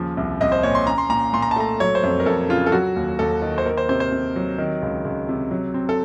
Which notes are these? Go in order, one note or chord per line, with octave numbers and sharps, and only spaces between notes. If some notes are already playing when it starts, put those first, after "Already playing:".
Already playing: D#2 C#3 F3
C2
C2 D#5
C5
A#2 C#5
C6
C#4 A#5
C6
A#2 A#5
A#2 C6
A#5
A5
A3 A#5
F#3 C#5
C5
F2
A#4
F2 A4
C#3 F4
A4
F#3 F#4
D#2
D#2 A4
D#3
C5
A#3 A#4
C5
C3 C5
C5
C3
F#3
D#3
C#2
C#2
C3
F#3
C4
A4